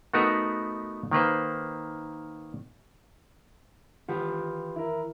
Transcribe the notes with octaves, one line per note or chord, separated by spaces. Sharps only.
A3 B3 D#4 F#4 A#4 B4
D#3 A#3 B4 C5
D#3 E3 F4 G4 B4 F#5
E4 A#4